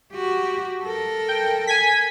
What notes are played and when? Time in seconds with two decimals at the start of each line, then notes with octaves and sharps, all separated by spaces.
0.12 F#4 G4
0.82 A4 A#4
1.28 G5
1.67 G#5 G#6 B6